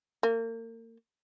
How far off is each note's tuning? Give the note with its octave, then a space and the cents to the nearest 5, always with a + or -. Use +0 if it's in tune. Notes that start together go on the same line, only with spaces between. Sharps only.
A#3 -35